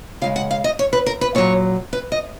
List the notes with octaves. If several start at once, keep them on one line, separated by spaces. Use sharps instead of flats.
C#3 F3 G#3 F5
F#5
F5
D#5
C#5
B4
A#4
B4
A#2 F#3 C#5
B4
D#5